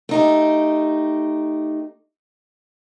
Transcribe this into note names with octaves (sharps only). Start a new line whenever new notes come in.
A3 D#4 G4